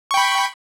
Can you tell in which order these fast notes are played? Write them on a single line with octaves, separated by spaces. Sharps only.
C#6 G5 B5